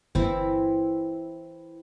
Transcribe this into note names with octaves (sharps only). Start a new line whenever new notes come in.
G1 E3 C4 E4